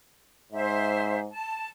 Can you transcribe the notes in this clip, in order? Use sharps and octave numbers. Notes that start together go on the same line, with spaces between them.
G#2 C5 E5
A5